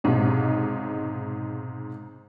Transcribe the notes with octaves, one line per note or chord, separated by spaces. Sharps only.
B1 G#2 C3